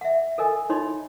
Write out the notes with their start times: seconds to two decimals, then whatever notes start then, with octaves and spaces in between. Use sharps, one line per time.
0.01 E5 F#5
0.38 A4 A#4 D#5 G#5
0.70 D#4 E4 C#5 D#5 B5 C6